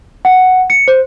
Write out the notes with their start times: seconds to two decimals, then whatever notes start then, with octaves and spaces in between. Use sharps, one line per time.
0.25 F#5
0.70 C#7
0.88 C5